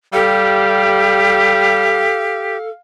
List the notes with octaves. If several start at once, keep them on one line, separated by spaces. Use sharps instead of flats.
G3 G4 A4 F5